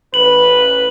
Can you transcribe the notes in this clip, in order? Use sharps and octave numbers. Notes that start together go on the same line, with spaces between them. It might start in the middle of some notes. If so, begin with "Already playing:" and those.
A1 B4 F#7